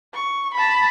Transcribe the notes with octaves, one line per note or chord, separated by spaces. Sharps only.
C#6
A5 B5